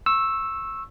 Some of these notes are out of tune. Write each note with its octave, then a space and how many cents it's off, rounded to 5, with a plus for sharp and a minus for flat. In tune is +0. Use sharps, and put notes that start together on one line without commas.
C#6 -25 E6 +0